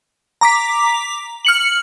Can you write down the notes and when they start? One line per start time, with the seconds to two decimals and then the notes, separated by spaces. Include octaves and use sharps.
0.41 A#5 D6 B6
1.45 F6 C#7 F#7